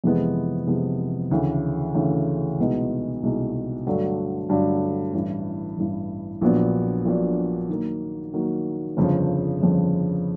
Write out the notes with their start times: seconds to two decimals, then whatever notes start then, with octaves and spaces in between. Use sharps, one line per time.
0.04 F2 C3 E3 G#3 B3
0.67 F2 C3 E3 G#3 B3
1.31 D2 C#3 E3 A3
1.94 D2 C#3 E3 A3
2.59 C2 B2 G#3 B3 D#4
3.23 C2 B2 G#3 B3 D#4
3.86 G2 D3 F#3 A3 D4
4.49 G2 D3 F#3 A3 D4
5.14 A1 G2 E3
5.78 A1 G2 E3
6.41 A#1 A#2 F#3 B3 D4
7.05 A#1 A#2 F#3 B3 D4
7.69 D#3 F#3 A#3
8.33 D#3 F#3 A#3
8.97 G1 F2 C#3 F3
9.61 G1 F2 C#3 F3